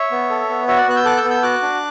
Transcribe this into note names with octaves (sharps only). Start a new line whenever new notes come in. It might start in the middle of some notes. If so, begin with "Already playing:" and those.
Already playing: C#5 E5
B3
A4
B3
F#4 C#5 E5
D5 F#5
B3 F#6
E6 G6
A4 D6 F#6
E6 G6
B3
E6 G6
F#4 D6 F#6
D4